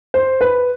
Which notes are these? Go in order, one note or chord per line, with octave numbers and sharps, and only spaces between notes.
C5
B4